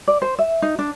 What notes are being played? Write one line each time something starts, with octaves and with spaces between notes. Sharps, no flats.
D5
C5
E5
D#4
D4